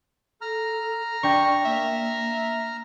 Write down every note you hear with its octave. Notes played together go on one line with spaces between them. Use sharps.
A4 A#5 F6
D4 D5 G5 C#6 A#6
A#3 E5